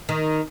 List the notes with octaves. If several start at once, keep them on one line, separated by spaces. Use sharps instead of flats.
D#3